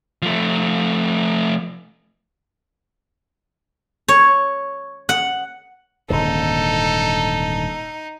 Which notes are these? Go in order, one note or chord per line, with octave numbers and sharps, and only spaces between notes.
F3 A3
C#5
F#5
D#1 G#2 D3 D#4 A4